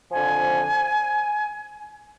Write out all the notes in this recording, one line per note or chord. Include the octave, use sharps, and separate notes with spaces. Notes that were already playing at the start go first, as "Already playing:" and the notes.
F2 D3 F3 G#5